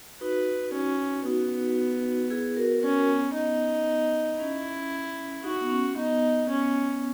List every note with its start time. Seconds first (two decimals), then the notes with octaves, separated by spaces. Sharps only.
0.21 D#4 F#4 B4
0.73 C#4
1.26 B3 D#4 F#4
2.30 E4 G#4
2.57 F#4 A#4
2.82 C#4 F#4 A#4
3.09 B3
3.34 D#4
4.39 C#4 E4
5.44 D#4 F#4
5.61 B3
5.70 C#4
5.96 B3 D#4
6.49 C#4